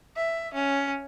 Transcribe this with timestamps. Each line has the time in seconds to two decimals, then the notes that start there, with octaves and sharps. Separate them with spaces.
0.16 E5
0.54 C#4